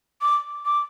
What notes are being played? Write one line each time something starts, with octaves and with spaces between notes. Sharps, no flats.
D6
D6